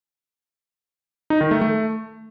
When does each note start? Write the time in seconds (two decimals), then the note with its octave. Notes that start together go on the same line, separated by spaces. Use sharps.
1.30 D#4
1.41 D#3
1.51 A3
1.61 A3